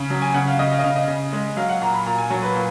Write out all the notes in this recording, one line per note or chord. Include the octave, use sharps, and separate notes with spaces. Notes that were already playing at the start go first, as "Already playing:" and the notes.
Already playing: C#3
F#3
G#5
C#3 F#5
F5
C#3 D#5
F5
D#5
C#3 F5
D#5
C#3
G#3
F#3 F5
F#5
A#2 A#5
B5
A#2 A#5
G#5
F#3 C#5
B4
A#2